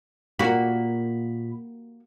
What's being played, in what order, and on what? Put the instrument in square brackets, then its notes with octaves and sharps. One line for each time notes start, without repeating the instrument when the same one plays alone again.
[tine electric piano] A#2 B5 [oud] A#3 F#4